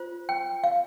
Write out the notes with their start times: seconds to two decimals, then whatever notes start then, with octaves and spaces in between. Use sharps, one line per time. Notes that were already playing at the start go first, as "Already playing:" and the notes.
Already playing: F4 C5
0.29 G5
0.64 F5